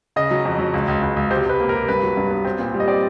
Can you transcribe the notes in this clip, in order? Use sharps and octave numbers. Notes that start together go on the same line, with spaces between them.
C#3 D#5
F#3
F2
F#3
C#2
C#2
C#2
C#2
C3 C5
C3 B4
A#3
A#4
C3
G2 B4
F#3
G2
B3
C4
A#2
G3
D#5
C4 D5